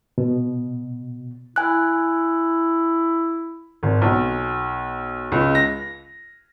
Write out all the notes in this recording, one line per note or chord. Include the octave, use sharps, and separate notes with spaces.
B2
E4 G#5 F#6
G#1
B1
C#2
A#6